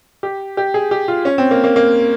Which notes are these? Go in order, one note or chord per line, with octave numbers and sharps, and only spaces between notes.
G4
G4
G#4
G4
F4
C#4
C4
A#3
A#3
A#3